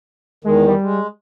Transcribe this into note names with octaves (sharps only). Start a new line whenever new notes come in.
E2 D#3 G#3
G3
G#3